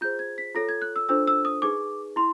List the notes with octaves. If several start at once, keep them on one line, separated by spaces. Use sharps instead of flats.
F4 G#4 C5 G6
G#6
B6
F4 A4 C#5 A#6
G#6
F#6
E6
D4 F4 A4 C5 E6
E6
D#6
D#4 G#4 B4 D6
E4 C6